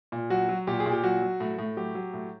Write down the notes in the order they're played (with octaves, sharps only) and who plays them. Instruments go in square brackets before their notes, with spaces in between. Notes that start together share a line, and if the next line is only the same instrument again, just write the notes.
[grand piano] A#2
F#3 F#4
F#3
A#2 G4
G#4
A#2
G4
F#3 F#4
F#3
A2
A2
F#3 G4
F#3
A2